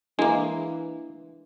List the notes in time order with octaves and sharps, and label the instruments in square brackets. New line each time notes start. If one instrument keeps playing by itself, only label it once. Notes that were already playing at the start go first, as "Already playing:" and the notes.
[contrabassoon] E3 [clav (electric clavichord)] G#3 A#3 [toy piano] D4